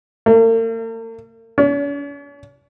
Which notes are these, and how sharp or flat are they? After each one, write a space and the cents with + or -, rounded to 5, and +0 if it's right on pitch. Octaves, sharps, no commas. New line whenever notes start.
A#3 -45
C#4 +45